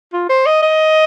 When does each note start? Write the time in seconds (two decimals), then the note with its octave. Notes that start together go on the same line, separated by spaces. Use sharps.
0.13 F4
0.29 C5
0.46 D#5
0.62 D#5